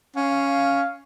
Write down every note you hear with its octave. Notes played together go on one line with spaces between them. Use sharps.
C#4 F5